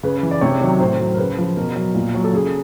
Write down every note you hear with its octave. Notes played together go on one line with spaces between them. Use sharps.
C#3 B4
E3
D5
C3 C#5
D#3 F#3
A2 C5
F#3
A#4
C#3 B4
F3
B2 A#4
F#3
A#2
F#3
A4
C#3 G#4